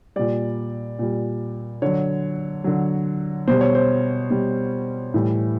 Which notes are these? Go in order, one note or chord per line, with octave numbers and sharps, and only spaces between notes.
A#2 G3 D5
A#2 G3
D3 F#3 C#5
D3 F#3
B2 G3 C5
C#5
C5
B2 G3
A2 E3 G3